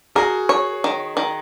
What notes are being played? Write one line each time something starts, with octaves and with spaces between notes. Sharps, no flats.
F#4 G#4 A#4
C#5
D#3
D#3